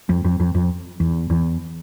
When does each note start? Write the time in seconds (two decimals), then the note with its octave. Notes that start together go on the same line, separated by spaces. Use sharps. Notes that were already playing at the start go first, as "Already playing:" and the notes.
0.09 F2
0.25 F2
0.40 F2
0.55 F2
1.00 E2
1.30 E2